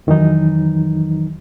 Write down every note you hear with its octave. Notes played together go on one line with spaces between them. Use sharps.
F2 D#3 E3 F#3 D#4